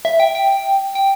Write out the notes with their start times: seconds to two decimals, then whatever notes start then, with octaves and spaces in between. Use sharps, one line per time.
0.05 E5
0.20 G5
0.35 G5
0.95 G5